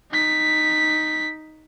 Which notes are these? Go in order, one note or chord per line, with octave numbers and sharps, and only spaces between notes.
D#4 B6